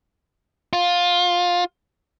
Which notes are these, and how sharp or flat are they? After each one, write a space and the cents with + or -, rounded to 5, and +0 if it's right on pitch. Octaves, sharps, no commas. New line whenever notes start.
F4 +15